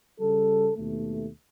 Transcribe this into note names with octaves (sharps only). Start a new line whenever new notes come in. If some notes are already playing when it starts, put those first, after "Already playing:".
C#3 G3 A4
D#2 B2 A3